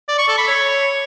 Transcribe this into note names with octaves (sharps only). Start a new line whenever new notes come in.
D5
C#6
A4
B5
C#5